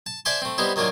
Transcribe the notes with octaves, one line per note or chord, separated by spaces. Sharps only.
A5
C5 D5 E5 G#5 A5 C6
A3 C4
G3 B3 C4 D#4 E4
D#3 F#3 A#3 D4 F4